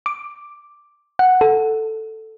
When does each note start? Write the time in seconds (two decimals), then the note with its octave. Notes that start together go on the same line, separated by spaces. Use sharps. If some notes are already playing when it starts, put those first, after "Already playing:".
0.06 D6
1.19 F#5
1.41 A4